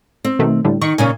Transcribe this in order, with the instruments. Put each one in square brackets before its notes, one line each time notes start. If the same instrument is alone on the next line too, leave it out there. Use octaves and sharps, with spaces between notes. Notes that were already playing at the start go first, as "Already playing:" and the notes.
[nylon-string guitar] C4
[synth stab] B2 D#3 A3
A2 D3 G3
[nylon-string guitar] D#3 [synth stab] C#6
[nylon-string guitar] A#2 C#3 C#4 [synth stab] G#5